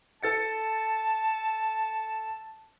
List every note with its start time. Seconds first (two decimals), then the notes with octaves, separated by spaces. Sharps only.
0.23 A4 A5 A6 C#7